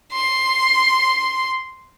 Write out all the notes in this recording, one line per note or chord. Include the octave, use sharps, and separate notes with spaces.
C6